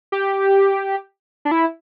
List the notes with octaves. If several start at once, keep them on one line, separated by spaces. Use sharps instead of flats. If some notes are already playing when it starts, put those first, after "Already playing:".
G4
D4
E4